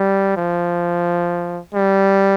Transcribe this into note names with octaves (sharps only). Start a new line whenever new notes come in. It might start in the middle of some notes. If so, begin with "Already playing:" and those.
Already playing: G3
F3
G3